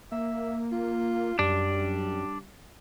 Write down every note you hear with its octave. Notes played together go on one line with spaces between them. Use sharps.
A#3 E5
F4
F#2 G3 D4